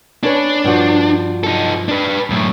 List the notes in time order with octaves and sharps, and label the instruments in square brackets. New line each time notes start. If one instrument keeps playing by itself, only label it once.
[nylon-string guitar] C#4 B4 C#5 [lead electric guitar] D4
[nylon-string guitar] G2 F3 F#4
[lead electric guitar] D#4 A4
D4 B4
F#2 A2